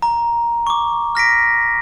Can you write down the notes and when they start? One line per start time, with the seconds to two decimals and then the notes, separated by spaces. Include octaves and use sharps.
0.02 A#5
0.67 C#6 D6
1.15 F6 A#6 B6 D7